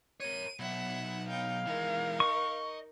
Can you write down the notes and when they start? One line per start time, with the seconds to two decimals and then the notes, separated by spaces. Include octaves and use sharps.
0.20 A#4 C#5 D#7
0.59 B2 F#3 E5 F#5
1.29 D#4 F5 G5
1.66 E3 G#3 D#4 A#4
2.20 D#5 C#6